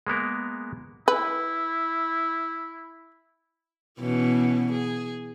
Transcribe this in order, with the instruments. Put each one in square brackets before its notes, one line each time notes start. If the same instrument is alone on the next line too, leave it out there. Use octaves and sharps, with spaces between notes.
[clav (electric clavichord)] G#3 A#3 B3 A#4
[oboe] E4 [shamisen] B4
[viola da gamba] B2 E3 C#4
G#4